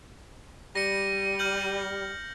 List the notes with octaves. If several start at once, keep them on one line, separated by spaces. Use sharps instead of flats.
G3 A#6 C#7 D#7
F6 G6 F#7